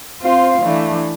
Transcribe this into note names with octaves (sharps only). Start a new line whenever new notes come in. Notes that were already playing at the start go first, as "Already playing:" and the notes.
C4 F4 C5 F5
E3 A3 D4